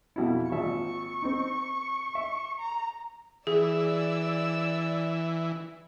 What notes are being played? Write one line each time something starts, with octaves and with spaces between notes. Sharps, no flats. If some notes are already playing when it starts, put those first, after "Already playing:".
F2 B2 E4
G#1 A#2 E5 C#6
C4 D#4
E5
A#5
E3 G#4 D5 E6